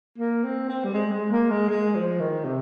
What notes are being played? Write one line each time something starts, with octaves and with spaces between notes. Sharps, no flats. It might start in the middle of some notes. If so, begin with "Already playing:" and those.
A#3
C4
C4
G3
G#3
G#3
A#3
G#3
G#3
F3
D#3
C3